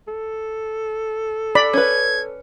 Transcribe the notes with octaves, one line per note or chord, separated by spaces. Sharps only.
A4
D5 B5
C#4 B4 G#6